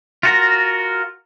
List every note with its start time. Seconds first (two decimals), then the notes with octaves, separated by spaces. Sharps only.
0.23 F4 F#4 A#4